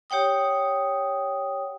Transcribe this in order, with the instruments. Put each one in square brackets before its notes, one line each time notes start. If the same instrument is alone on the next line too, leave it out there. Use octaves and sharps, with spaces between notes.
[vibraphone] G4 C#5 F#5 G5 D#6